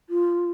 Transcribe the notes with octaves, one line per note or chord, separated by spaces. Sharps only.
F4